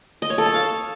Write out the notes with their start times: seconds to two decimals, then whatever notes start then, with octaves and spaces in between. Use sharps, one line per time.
0.22 D#5
0.30 C#5
0.38 A4
0.46 A5
0.54 F5